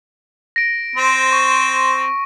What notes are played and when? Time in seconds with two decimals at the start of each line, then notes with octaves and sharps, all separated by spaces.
0.56 A#6 D7
0.96 C4 C5
1.33 C#6